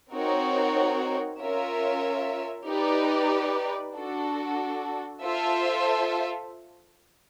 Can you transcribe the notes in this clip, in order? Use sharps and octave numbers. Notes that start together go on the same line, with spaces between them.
C4 D#4 F#4 A#4 C#5
C#4 F4 A#4 C#5 E5
D#4 G4 B4 D5
D4 F#4 A4
F4 A4 C5 E5